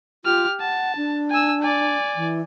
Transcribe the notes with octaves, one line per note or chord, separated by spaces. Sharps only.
F4 G4 F6
F#5 A5
D4
G#5 E6
D5 G#5
E3